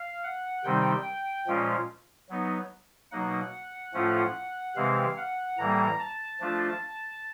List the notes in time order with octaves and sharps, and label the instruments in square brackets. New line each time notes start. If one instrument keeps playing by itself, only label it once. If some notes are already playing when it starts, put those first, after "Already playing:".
Already playing: [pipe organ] F5
F#5
C3 D#3 G3 C4 D#4 G5
A#2 F3 G#3 C#4 F4
F#3 B3 D#4
B2 F#3 A#3 D#4 F#5
A2 F3 A3 C#4 F4
C3 E3 G#3 C4 F5
F#5
A2 E3 G3 A#3 A#5
A5
F3 A3 D4 F4